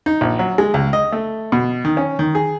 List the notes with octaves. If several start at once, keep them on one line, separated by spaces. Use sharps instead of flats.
D#4
A#1
F#3
G#3
C#2
D#5
A3
B2
D#3
C#4
D#3
G#4